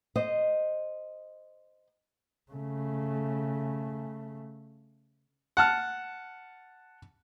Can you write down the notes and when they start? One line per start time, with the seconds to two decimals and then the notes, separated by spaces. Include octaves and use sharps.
0.16 C5 D#5
2.52 C#3 A3
5.57 F#5 A5 F6